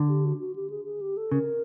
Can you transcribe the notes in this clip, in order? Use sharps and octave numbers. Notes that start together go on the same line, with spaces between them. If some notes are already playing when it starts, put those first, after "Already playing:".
Already playing: D3
G4
F#4
F#4
G4
G#4
G#4
G4
A4
C#3 A#4